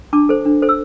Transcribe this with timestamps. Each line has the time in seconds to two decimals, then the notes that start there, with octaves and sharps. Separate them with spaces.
0.13 D4 A5 D6
0.29 A4 C5
0.46 D4
0.62 A4 C5
0.69 E6